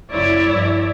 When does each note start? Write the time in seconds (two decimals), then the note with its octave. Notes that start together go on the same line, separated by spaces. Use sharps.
0.12 F#1 E4 C#5 D5 E5
0.47 G2 F3